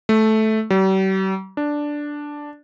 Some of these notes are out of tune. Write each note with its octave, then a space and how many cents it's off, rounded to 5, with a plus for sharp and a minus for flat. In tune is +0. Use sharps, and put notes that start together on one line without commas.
A3 -10
G3 -45
D4 +0